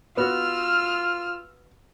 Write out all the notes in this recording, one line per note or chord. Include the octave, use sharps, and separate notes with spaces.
B3 F4 F#4 E6 F6